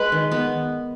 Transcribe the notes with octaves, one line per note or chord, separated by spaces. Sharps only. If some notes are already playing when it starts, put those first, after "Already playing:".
Already playing: G#3 B4
D#3
B3